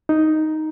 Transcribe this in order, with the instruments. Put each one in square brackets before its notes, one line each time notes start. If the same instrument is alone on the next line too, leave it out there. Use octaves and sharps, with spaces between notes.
[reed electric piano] D#4